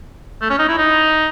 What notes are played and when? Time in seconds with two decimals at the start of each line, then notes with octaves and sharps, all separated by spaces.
0.41 A3
0.50 C#4
0.59 D#4
0.68 E4
0.78 D#4